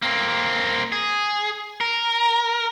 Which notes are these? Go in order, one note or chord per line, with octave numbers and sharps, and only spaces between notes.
A#3 C4
G#4
A#4